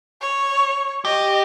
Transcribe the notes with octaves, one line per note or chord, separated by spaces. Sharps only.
C#5
G4 D#5